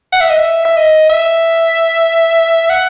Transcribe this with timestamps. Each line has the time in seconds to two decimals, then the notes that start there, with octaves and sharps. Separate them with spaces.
0.13 F#5
0.21 E5
0.30 D#5
0.38 E5
0.65 E5
0.77 D#5
1.10 E5
2.70 F#5